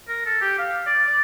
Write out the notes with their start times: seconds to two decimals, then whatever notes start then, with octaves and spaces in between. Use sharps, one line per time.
0.08 A#4
0.26 A4
0.41 G4
0.58 F5
0.86 D5
1.07 D5